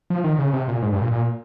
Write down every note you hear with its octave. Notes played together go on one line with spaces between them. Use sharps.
F3
D#3
C#3
C3
A#2
G#2
G2
A#2
A#2